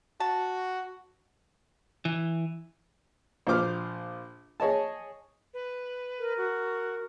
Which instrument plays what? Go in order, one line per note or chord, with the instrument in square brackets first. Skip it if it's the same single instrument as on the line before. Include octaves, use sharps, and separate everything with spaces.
[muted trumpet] F#4 [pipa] A5
[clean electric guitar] E3
[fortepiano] A#1 F4 C5 D6 F6
G#4 C#5 D#5 A5
[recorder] B4
[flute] A#4
[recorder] F#4